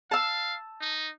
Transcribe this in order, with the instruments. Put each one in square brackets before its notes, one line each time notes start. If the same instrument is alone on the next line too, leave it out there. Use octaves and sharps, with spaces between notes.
[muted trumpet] F5 [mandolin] A5 E6
[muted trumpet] D#4